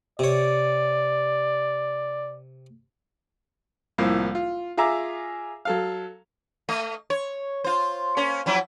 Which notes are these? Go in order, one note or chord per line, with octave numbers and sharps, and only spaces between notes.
C3 C#5 D5
C2 A2 F3 A#3
F4
F4 G#4 E5 A#5 D6
F#3 A4 F5
A3 D#5
C#5
F4 C5
A#3 C#4
F3 F#3 E4